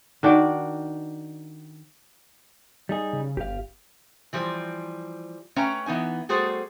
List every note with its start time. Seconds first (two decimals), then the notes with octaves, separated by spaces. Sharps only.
0.23 D#3 D4 F#4 D5
2.89 G3 D#4 G#4
3.13 C#3
3.37 G1 G4 F5
4.33 E3 F3 G3 C5
5.56 A3 C#4 B4 C#5 G5 A#5
5.86 E3 B3 D#4 G#5
6.29 G3 A3 F#4 G#4 A4 C5